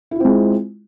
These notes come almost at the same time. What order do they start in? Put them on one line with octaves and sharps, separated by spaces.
E4 F4 C4 G#3